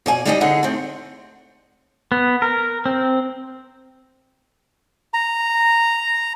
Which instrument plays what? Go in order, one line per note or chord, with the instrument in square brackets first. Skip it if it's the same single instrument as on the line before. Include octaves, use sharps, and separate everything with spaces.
[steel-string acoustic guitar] B2 D5 G#5
G3 D4 D#4 G4 D#5 G5
D3 D#4 G#4 F#5
A3 C4
[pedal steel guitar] B3
A#4
C4
[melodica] A#5